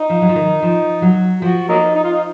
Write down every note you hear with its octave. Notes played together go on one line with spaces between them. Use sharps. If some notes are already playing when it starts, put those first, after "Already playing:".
Already playing: D#4
F3
F#3
F3
D#3
F3
F#3
F3 F#4
F#3 A#3 D#4
D#4
F4
D#4